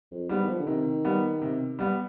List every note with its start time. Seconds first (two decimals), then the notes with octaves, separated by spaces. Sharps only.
0.11 F2
0.29 G#2 G3 B3
0.42 D#3
0.48 F3
0.59 D3
0.66 C3 D#3
1.05 G3 B3
1.42 C3
1.79 G3 B3